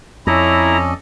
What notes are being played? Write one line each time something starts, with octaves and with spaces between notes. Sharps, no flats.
F2 C#4 E4 A4 D5 D#5 A#5